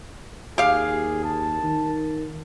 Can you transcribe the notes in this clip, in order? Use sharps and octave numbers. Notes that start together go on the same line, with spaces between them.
D#2 G4 G#4 F5
A5
D#3